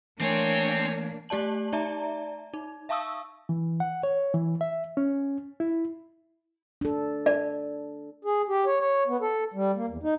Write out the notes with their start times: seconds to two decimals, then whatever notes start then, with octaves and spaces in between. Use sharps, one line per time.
0.20 E3 A3 A#3 C4 D4 C#5 G#5
1.29 A3 G4 D5 A5 F#7
1.73 D#4 D5 E5 A5 A#5
2.54 D#4
2.89 E5 F5 A5 C#6 D#6 E6
3.49 E3
3.80 F#5
4.03 C#5
4.34 E3
4.61 E5
4.97 C#4
5.60 E4
6.81 D4 A4
7.26 D5
8.25 G#4
8.49 G4
8.66 C#5
8.80 C#5
9.08 B3
9.21 A4
9.54 G3
9.76 A#3
9.88 E2
10.03 D#4